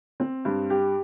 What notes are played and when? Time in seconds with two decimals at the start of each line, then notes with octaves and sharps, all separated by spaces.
0.20 C4
0.45 G2
0.70 G4